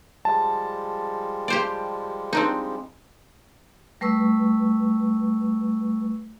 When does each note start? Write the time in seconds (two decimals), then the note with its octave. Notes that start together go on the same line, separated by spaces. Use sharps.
0.25 F3 G3 G#3 A5
1.48 G4 C5 D5
2.33 C4 D4 D#4
4.01 G3 A3 B4 C#6 E6